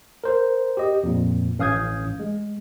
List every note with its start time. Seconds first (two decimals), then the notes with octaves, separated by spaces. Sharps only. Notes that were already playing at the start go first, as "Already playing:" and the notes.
0.24 A#4 C5
0.77 G4 D#5
1.03 F2 A#2
1.59 A1 C#4 F5 D#6 G6 G#6
2.20 G#3